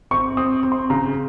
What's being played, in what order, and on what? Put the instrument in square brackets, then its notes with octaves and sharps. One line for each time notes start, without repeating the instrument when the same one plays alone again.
[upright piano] C4 [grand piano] C#6
[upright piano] C4 [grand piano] D#6
[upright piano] C4
[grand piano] C6
[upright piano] C#3 [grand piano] A#5